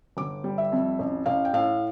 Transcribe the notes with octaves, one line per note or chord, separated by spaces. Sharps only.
G1 D6
G3
E5
F2
A1
A1 F5
G5
A2 F5